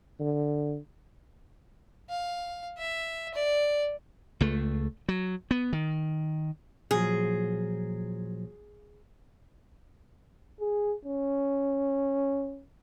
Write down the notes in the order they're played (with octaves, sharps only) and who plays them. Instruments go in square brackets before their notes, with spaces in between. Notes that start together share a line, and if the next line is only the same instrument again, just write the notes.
[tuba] D3
[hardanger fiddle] F5
E5
D5
[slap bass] C#2 A3
F#3
B3
D#3
[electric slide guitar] A#2 F3 F#3 [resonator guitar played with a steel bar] G#4
[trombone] G#4
C#4